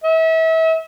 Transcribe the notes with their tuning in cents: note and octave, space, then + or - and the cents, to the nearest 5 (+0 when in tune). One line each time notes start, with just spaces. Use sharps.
E5 -35